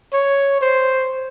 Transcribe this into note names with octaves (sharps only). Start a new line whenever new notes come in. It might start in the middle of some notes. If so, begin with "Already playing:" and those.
C#5
C5